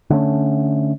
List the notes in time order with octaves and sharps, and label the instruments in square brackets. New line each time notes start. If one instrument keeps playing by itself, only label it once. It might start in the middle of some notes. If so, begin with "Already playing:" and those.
[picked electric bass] D3 A3 C#4